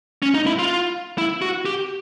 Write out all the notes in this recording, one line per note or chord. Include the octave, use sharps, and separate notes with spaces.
C#4
D#4
E4
F4
E4
F#4
G4